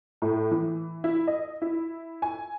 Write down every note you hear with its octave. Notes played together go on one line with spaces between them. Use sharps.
A2
E3
E4
D#5
E4
G#5